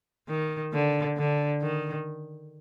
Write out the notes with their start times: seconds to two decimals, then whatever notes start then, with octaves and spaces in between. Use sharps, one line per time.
0.28 D#3
0.73 D3
1.17 D3
1.62 D#3